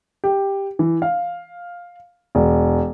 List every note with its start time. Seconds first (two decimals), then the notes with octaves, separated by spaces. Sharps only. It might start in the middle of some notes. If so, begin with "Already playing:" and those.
0.24 G4
0.79 E3
1.02 F5
2.35 E1